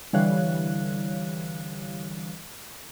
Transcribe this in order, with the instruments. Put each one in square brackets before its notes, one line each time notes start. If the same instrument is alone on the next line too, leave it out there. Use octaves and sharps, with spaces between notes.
[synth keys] D3 E3 G3 C#5 F5 F#6